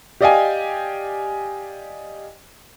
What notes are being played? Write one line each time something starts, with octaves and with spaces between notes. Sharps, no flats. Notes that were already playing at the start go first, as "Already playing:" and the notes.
G4 D5 D#5 F5 G5 G#5